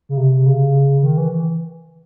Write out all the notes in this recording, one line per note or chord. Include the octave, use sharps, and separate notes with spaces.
C#3
C3
C#3
D#3
E3